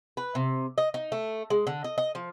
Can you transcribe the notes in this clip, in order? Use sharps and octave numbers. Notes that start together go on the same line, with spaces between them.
B4
C3
D#5
D#4
A3
G#3
D3
D#5
D#5
F3